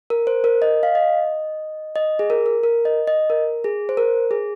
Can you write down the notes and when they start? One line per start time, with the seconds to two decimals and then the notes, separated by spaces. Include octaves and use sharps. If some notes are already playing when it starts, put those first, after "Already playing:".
0.10 A#4
0.27 C5
0.44 A#4
0.62 D#5
0.83 F5
0.95 D#5
1.96 D#5
2.19 G#4
2.30 A#4
2.46 A#4
2.63 A#4
2.85 D#5
3.07 D#5
3.30 A#4
3.64 G#4
3.89 C5
3.97 A#4
4.31 G#4